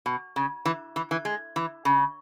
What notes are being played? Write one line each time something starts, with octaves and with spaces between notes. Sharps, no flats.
B2
C#3
E3
E3
E3
G#3
E3
C#3